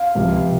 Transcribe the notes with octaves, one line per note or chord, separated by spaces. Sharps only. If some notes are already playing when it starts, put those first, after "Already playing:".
Already playing: F5
C#2 C3 F3